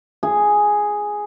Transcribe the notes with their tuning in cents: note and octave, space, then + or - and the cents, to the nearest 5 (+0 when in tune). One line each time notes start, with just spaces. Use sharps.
G#4 +0 G#5 +0